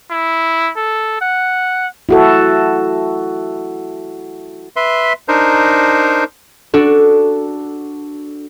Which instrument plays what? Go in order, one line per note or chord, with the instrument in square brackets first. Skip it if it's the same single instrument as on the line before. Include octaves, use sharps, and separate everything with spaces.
[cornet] E4
A4
F#5
[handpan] E4 F#4 A4
[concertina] B4 E5 C6
D4 D#4 A#4 C5
[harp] D4 F#4 A4